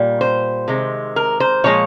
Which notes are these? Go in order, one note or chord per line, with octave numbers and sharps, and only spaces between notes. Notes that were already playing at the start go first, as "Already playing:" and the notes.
Already playing: A#2 G3
C5
C3 D#3 G#3
A#4
C5
A#2 F3 G#3 C#5